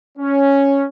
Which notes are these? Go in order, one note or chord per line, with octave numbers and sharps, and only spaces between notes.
C#4